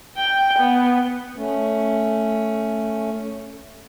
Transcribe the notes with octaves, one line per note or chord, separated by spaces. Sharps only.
G5
B3
A3 C#4